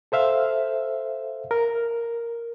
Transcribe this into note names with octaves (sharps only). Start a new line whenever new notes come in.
A4 C5 E5 F5
A#4